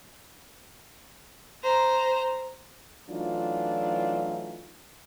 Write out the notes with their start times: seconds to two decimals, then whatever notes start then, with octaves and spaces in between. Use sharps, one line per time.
1.63 C5 A#5
3.10 E3 F#3 A3 D4 D#4 F4